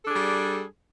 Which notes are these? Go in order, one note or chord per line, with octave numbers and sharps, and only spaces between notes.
G3 D4 G#4 A4